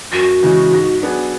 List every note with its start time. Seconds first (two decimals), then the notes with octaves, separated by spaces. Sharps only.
0.12 F#2 F#4
0.43 C#3 E3 G#3
0.72 G#2
1.02 F#3 B3 D4 G#4